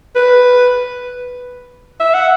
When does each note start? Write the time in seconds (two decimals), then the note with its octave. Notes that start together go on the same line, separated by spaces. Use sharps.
0.16 B4
2.00 E5
2.14 F#5